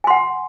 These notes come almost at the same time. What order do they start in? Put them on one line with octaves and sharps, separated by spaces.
G#5 C6 F#5